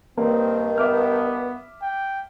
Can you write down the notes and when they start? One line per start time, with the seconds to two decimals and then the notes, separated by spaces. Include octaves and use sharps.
0.17 G2 D#3 A#3 C4
0.78 B3 E5 D6 F6
1.82 G5